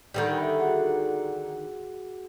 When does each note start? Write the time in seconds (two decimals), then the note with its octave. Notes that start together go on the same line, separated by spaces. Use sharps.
0.14 D3 D#3 G3
0.38 E5 B5
0.60 F#4 G#4 F#5